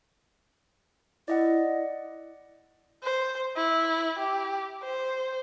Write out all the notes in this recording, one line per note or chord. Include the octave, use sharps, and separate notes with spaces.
E4 D5 D#5 F#5
C5
E4
G4
C5